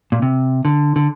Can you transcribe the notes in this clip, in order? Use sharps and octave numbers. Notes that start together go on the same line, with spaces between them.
A#2
C3
D3
D3